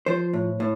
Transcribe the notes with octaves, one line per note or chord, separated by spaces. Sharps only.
F3 C5
A2
A2